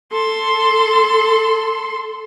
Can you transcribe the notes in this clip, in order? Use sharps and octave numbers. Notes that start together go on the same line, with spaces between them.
A4 C6